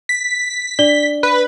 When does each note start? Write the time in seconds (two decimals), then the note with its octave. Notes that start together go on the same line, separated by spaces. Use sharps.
0.09 B6
0.79 D4 D5 G7
1.23 B4